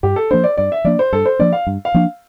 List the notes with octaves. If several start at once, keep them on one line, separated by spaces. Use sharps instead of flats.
G2 G4
A4
F3 A#3 D4 C5
D5
G2 D5
E5
F3 A#3 D4 D5
C5
G2 A4
C5
F3 A#3 D4 D5
F5
G2
F5
F3 A#3 D4